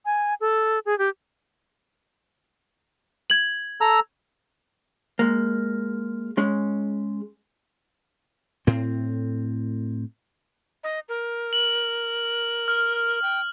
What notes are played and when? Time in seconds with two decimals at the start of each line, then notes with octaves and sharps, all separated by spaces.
0.05 G#5
0.41 A4
0.86 G#4
0.98 G4
3.30 G#6 F#7
3.81 A4 A#5 E6
5.19 G#3 A#3
6.38 G#3 C#4
8.67 A2 C4
10.84 D#5
11.09 A#4
11.53 F#7
12.68 F6
13.22 G5